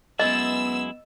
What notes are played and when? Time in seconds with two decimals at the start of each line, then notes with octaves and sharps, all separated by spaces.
0.19 F#2 G#3 B3 E4 D#5 E6